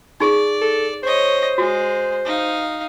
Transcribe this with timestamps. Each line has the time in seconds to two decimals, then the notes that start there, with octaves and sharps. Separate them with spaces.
0.20 D#4 G#4 D5
0.61 A4
1.04 C5 C#5 D#5
1.58 G#3 F#4
2.25 D#4 F5